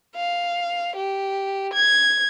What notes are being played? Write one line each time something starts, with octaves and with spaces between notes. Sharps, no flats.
F5
G4
G#6